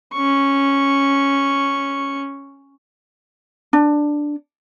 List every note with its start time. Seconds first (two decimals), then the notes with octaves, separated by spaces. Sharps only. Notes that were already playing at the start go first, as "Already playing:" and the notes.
0.13 C#4 C#6
3.73 D4